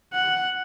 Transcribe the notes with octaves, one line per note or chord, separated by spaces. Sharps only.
F#5